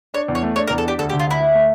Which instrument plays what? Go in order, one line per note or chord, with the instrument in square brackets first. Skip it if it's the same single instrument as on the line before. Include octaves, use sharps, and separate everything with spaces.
[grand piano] D4 [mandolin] C#5
[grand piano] E2
[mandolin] C#5
[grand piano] A3
[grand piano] D4 [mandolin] C#5
[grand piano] E2 [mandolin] A#4
[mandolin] A4
[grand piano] D4 [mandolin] G4
[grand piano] D2 [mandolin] A4
[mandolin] G4
[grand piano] D3
[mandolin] F4
[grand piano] D2 [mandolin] E4
[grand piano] D2
A3